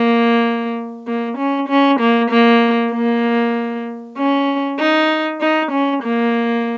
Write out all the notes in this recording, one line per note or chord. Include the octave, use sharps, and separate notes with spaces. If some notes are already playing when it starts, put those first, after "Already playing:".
Already playing: A#3
A#3
C#4
C#4
A#3
A#3
A#3
C#4
D#4
D#4
C#4
A#3